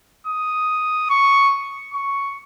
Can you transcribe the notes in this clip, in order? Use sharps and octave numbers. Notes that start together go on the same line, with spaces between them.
D#6
C#6
C#6